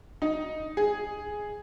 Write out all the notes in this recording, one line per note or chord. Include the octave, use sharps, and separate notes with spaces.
D#4
G#4